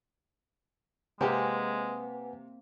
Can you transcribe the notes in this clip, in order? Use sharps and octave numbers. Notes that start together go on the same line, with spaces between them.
C3 G#3 A#3 C4 G4 B4 F#5 G#5